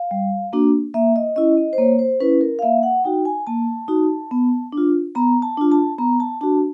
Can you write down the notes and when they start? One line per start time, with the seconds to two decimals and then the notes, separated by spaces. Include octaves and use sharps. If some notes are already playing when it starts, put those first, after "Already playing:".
Already playing: F5
0.11 G3
0.53 A#3 D4 F#4
0.94 A#3 E5
1.16 D#5
1.36 C#4 E4 D#5
1.57 D#5
1.73 C5
1.78 A#3 C#5
1.99 C5
2.21 C#4 E4 B4
2.41 A#4
2.59 F5
2.62 A#3 E5
2.83 F#5
3.04 D#4 F#4 G5
3.25 G#5
3.47 A#3 A5
3.88 D#4 F#4
4.31 B3
4.73 D4 F4
5.15 B3 A#5
5.42 A5
5.57 D4 F4
5.72 A5
5.98 B3 A#5
6.20 A5
6.41 D4 F#4 A5